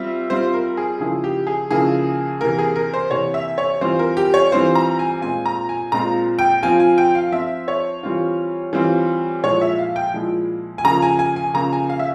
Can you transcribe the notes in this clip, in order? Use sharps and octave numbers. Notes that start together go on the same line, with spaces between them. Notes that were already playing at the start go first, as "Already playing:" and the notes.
Already playing: G3 C4 F4 E5
G3 C4 F4 C5
A#4
G#4
C#3 F3 A#3 E4 G#4
G4
G#4
C#3 F3 A#3 E4 G#4
C3 E3 A#3 A#4
G#4
A#4
C5
C3 E3 A#3 C#5
E5
C#5
E3 G3 C4 F4 C5
A#4
G4
C#5
E3 G3 C4 F4 C5
A#5
G#5
A#2 G#3 C4 F4 G#5
A#5
G#5
A#2 G#3 C4 F4 A#5
G5
F3 C4 F4 G#5
G#5
G5
F5
F3 C4 F4 E5
C#5
E3 G3 C4 F4
E3 G3 C4 F4
A#2 F3 G#3 E4 C#5
E5
F5
G5
A#2 F3 G#3 E4
G#5
C#3 F3 A#3 A#5
G#5
G#5
G#5
C#3 F3 A#3 A#5
G#5
F5
E5